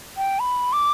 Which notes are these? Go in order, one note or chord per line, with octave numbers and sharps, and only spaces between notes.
G5
B5
D6